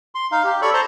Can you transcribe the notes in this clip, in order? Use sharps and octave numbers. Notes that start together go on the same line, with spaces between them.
C6
D#4 F5
G4
A4 C#5 D5 B5 C#6
C5 A5 A#5 C6